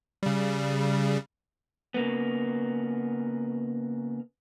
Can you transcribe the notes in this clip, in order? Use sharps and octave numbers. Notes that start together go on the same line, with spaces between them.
C#3 G3
C#3 A#3 B3